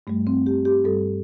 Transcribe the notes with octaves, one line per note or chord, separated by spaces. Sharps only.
G2 G3 A3
C4
G4
G4
G2 G3 A4